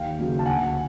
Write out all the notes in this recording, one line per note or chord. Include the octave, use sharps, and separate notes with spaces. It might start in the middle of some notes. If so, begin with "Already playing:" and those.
Already playing: D#2 F5 G5
C#3 F#3 A#3
A5
D2 F#5 G#5